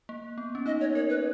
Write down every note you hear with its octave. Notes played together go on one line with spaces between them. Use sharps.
A#3
B3
C#4
D#4 D#5
C#5
A#4 C#5
B4